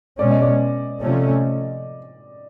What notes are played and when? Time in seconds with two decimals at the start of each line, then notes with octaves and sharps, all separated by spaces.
0.19 B2 G#3 C#4 D5
0.31 D#5
0.42 D5
1.01 C3 F3 A3 C#4